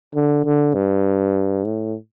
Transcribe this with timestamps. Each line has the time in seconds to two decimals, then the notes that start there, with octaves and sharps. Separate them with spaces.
0.15 D3
0.44 D3
0.74 G2
1.64 A2